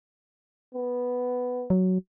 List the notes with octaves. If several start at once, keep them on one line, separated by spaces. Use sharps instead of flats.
B3
F#3